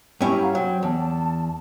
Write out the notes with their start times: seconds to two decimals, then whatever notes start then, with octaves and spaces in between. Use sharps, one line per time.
0.21 G2 C#4 E4 G5 C#6
0.42 F5 F#5 A#5
0.55 F#3 C5 C#5 G5
0.83 E2 A5